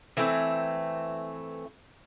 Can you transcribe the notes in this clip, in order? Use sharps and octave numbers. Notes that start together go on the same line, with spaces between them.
E3 A3 C4